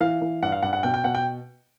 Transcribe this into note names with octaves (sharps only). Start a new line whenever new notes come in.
E3 F5
E3
G2 F#5
F5
G2 F#5
F#5
B2 G5
G5
B2 F#5
G5